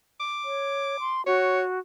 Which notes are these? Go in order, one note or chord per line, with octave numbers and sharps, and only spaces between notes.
D6
C#5
C6
F#4 C#5